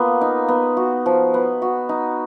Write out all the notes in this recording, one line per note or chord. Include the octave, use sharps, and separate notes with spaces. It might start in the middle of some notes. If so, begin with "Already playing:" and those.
Already playing: A#3 B3 F4
D#4
B3
F#4
F3
B3
F#4
D#4